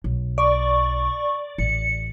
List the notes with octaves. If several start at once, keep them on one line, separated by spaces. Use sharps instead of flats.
B1
D5 C#6
A1 C#7